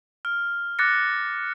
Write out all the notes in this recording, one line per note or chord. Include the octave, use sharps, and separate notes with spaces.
F6
D6 F#6 A6 A#6 C#7